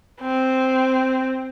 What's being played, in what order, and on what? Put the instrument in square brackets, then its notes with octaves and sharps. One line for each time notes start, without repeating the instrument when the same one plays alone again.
[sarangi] C4